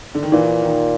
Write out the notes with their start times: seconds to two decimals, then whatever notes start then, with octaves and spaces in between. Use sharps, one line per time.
0.15 D3
0.23 D#3
0.32 A#2 E3
0.62 D#3